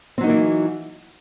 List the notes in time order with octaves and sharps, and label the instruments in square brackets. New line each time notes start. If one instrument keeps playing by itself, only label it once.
[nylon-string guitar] C4
F#3
D#4
A#3
E3